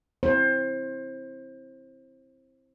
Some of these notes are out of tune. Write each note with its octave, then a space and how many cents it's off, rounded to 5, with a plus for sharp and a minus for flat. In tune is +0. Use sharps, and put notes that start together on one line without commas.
C4 +0 E4 +0 C5 +25